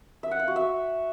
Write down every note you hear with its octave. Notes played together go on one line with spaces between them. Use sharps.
E5
F#5
F5
F#4
E5